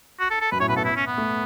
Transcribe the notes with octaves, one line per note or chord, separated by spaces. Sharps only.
F#4
A4
A4
F#2 B4
A2 C#5
B2 B4
B3 A4
E4
C#4
B3
A3